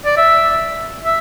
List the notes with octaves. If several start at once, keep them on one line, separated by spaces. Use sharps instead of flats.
D5
E5
E5